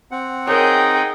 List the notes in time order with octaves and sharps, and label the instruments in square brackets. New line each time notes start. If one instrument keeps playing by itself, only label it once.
[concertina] C4 F#5
[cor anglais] D#4 [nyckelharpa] G#4 G5 [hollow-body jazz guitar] A#4 C#5